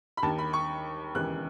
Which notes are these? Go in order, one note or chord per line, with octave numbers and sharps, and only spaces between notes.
B5
D#2 D#3 A5
B5
C#6
E1 D#2 C#3 E3 F#6